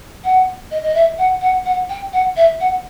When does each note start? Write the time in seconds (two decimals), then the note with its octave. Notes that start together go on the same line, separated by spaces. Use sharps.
0.24 F#5
0.71 D#5
0.83 D#5
0.94 E5
1.18 F#5
1.41 F#5
1.65 F#5
1.89 G5
2.13 F#5
2.36 E5
2.60 F#5